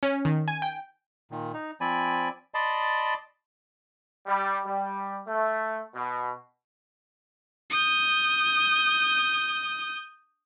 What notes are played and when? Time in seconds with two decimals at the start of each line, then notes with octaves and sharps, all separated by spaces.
0.03 C#4
0.25 D#3
0.48 G#5
0.62 G5
1.31 A#2 D#3
1.54 D#4
1.81 F3 C4 D5 G#5 B5
2.54 D5 D#5 A5 B5 C6
4.26 G3
4.65 G3
5.27 A3
5.95 B2
7.70 D#6 G6